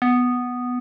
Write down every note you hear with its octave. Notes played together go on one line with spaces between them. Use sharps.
B3